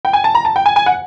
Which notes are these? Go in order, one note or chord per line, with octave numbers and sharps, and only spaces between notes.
G5
G#5
A5
A#5
A5
G5
G#5
G#5
F#5